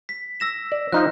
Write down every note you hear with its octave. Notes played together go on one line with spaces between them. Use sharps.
B6
E6 A#6 E7
D5
F3 D#4 F5 F#6